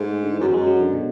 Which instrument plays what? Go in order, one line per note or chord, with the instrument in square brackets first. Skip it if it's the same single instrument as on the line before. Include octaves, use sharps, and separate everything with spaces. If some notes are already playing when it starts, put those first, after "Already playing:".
Already playing: [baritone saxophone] G#2 [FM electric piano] A3
[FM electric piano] D3
E3
[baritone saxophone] F#2
[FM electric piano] F#3
[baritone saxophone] E2
[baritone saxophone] F#2 [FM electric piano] G#3
[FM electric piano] F#3
D3
B2